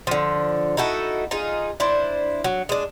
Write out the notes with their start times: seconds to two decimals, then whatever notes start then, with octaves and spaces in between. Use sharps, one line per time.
0.07 D3 F3
0.77 D#4 E4 F#4 A4
1.31 D#4 F4 G#4
1.80 D4 E4 C5
2.44 F#3
2.69 G#3 D4